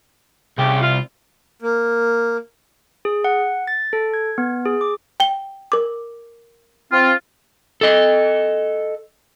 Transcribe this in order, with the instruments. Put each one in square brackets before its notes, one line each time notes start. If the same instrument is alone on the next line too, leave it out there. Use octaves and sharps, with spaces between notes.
[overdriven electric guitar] C2 [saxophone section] C#3 G4
[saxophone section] F4
[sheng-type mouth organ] A#3
[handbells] G#4
F#5
A6
A4
G#6
B3
G#4
D6
[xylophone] G5 G7
A#4 D6
[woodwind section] C4 F4
[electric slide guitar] A4 D#5